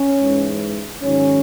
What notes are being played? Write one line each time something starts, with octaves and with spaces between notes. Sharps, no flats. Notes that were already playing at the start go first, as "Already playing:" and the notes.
Already playing: C#4
G#2 E3
G#2 D#3 F#3 C#4